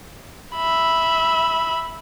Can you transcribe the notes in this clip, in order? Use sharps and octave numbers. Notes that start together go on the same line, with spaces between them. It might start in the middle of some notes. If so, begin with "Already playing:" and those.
E5 B5